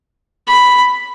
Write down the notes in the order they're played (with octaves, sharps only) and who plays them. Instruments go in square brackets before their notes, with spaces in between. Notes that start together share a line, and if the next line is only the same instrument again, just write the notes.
[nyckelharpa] B5